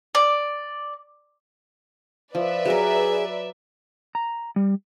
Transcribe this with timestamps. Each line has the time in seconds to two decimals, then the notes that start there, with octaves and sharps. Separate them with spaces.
0.15 D5
2.35 F3 B4 D5 E5
2.65 F#3 G#4 A#4
4.15 A#5
4.56 G3